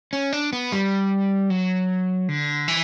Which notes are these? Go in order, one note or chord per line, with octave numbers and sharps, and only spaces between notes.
C#4
D4
B3
G3
F#3
D3
E3